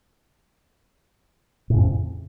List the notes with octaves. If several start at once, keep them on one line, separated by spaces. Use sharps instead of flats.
F2 A2 C#3